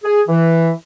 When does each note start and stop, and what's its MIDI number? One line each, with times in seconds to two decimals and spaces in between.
0.04 0.21 68
0.28 0.71 52